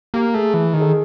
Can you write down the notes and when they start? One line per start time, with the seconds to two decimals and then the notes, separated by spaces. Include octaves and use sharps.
0.14 A#3 G4
0.34 A3 G#4
0.54 E3
0.74 D#3 G#4
0.81 A4
0.89 G#4